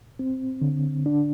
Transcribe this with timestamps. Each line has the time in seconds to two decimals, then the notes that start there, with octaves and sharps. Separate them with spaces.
0.19 C4
0.61 D3
1.06 D4